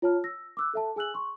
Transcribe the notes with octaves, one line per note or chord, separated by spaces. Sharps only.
F4 C#5 A5 F6
E6 A#6
D6 E6 F#6
A4 E5 A5
G#4 G#5 E6 F#6 F#7
C6 C#6